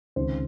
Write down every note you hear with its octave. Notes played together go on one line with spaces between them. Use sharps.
C#2 C3 D#3 C5